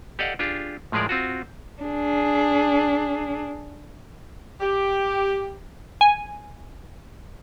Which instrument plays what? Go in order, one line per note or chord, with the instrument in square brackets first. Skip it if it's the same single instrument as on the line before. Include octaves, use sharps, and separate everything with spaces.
[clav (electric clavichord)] G4 A4 D5 D#5 F5 F#5
D4 F4 G4 G#4
A2 F3 G#3 G#4 A#4 D5
C4 F4 F#4
[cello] D4 G#4
[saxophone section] G4
[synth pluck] G#5